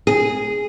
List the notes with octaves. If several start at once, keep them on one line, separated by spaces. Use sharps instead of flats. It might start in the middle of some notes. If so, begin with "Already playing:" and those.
G#4